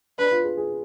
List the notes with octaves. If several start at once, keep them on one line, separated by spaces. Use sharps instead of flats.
D4 B4
F4
G#4
G#4